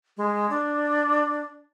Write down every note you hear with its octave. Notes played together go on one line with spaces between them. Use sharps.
G#3
D4